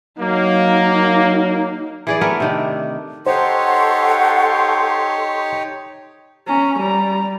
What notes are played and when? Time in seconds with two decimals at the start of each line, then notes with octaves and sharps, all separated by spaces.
0.20 F#3 A#3 D#4
2.07 E3 G#4 D5
2.21 A3 B3 A#4
2.40 C3 D#3 D4
3.27 D#4 G4 A4 C5 C#5 F#5 C6 C#6
6.48 C#4 A#5
6.79 G3 A#5